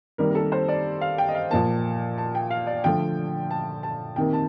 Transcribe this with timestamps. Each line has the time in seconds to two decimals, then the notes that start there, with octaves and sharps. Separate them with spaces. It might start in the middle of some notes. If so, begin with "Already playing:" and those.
0.18 C3 D#3 G3 A#3 A#4
0.30 A#4
0.35 A4
0.52 C5
0.68 D5
1.01 F5
1.18 G5
1.28 D#5
1.35 F5
1.51 A#2 F3 A#3 A5
2.18 A5
2.35 G5
2.51 F5
2.67 D5
2.84 D3 F3 A3 G5
3.51 A5
3.83 A5
4.16 C3 D#3 A#3 G5
4.33 A5